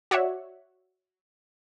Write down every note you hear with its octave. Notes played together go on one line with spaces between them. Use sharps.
F#4 C#5 D5 E5 F#5